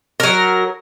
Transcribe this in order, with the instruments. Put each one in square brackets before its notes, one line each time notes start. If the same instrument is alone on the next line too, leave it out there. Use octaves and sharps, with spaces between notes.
[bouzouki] F#3 A#4